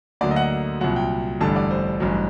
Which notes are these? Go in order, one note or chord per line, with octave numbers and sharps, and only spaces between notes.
D2 D3 F#3 A#3 D5
D#5
F#5
D#5
C2 A#2 F#3 F#5
G5
A1 G2 D3 G3 A5
D5
C5
A1 G2 F#3